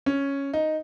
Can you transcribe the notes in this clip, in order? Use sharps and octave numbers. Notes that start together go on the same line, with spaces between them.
C#4
D#4